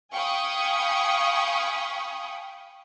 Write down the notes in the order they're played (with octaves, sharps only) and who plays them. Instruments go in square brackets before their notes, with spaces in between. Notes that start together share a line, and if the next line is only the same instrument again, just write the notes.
[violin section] F5 G5 G#5 B5 C#6 D#6